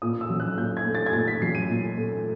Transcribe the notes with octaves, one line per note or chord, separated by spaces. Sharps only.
A#2 D#6
E6
F#3
F#6
A#2 G6
G#6
A3
A6
G#6
A#2 A6
B6
F#3 C7
D#7
A#2
A3